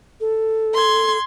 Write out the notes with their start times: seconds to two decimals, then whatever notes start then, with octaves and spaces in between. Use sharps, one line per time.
0.20 A4
0.74 C6 G#6